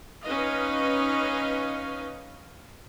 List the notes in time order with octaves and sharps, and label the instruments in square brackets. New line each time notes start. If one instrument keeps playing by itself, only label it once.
[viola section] C#4 D#4 B4 D#5 F5